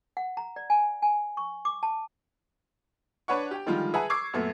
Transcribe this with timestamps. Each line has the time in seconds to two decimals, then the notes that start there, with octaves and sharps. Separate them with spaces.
0.17 F#5
0.37 A#5
0.56 D5
0.70 G#5
1.02 G#5
1.37 C#6
1.65 D6
1.83 A5
3.28 D4 B4 C#5 F#5 C#6
3.51 G4 G5
3.66 D3 D#3 F3 G3 G#3 F4
3.94 G#4 B4 E5 F#5 A5 A#5
4.10 C#6 D6 E6 G#6 C7
4.34 F#2 A#2 A3 B3